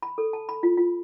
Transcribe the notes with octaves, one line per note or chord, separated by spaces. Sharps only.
B5
A4
A5
B5
F4
F4